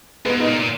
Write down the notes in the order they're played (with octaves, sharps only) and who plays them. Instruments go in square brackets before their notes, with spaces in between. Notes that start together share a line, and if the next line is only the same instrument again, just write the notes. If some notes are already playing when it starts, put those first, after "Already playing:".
[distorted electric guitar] G#2 [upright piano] G#3 B3
[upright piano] B3 D#4
[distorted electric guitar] A#2
A#2